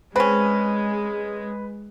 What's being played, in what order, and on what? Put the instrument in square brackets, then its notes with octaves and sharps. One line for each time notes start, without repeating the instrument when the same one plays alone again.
[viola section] G#3 [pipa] C4 C#4 [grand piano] B4